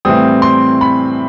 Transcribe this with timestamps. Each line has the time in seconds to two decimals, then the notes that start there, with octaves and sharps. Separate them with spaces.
0.05 A2 E3 G3 C4 D#6
0.42 C6
0.81 B5